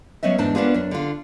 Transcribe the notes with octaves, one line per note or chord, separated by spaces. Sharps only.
F#3 B3 C#4 D#5 E5
E2 G#2 D4 A5
A#3 B3 C#4 D4 F4 G#4
F#2 D4
D3 F4